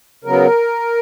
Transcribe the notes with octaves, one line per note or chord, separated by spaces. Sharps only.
C#3 F#3 B3 A#4